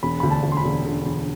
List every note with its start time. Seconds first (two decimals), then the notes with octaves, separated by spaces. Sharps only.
0.03 E1 B5
0.20 D2 B5
0.30 A5
0.43 D2
0.52 C6
0.57 B5
0.64 E1
0.84 D3
1.05 E1